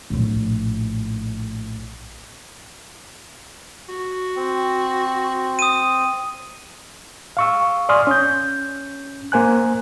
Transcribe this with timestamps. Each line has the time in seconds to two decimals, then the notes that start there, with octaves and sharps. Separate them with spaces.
0.10 A#1 A2
3.89 F#4
4.36 C4
5.59 D#6 D#7
7.37 F5 C#6 E6
7.89 D5 G#5 C6 D#6 F6
8.07 C#4 G6
9.32 A#3 C5 G#5 F#6